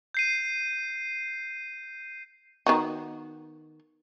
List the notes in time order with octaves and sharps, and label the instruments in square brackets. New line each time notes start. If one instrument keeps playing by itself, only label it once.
[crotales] G6 C7 D#7
[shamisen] D#3 B3 F#4